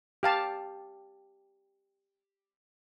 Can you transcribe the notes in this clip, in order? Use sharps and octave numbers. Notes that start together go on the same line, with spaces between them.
G4 F5 A5